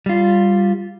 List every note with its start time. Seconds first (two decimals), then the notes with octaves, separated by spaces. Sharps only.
0.06 G3 F4